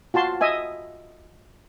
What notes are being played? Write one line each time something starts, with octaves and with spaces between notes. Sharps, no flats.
F4 F#4 A5 C6
D#5 E5 G#5